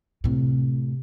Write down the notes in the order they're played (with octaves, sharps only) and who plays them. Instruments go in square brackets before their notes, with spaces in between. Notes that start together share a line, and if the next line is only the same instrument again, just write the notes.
[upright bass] A2 C3